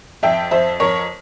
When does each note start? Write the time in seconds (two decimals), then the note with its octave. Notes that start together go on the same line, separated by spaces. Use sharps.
0.23 F2 E5 G5
0.51 F2 C5 E5
0.80 F2 A#4 C#5